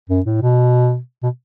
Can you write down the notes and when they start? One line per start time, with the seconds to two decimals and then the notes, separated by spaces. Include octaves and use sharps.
0.09 F#2
0.26 A2
0.42 B2
1.23 B2